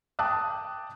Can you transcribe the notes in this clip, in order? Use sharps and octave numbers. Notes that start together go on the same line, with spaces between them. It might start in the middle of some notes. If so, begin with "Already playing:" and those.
G5 A5 D6 D#6 F#6